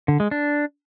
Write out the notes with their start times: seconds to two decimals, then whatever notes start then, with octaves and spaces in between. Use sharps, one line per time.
0.08 D3
0.20 G#3
0.31 D4